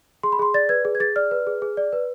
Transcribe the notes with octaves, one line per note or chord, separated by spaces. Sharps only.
G#4 C6
B5
G#4 C6
D5 A6
B4 G#6
G#4
G#6
G#4 A6
D5 F6
B4
G#4
G#4
D5
B4